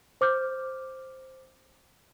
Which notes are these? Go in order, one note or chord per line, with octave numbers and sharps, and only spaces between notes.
C5 D6 F6 G6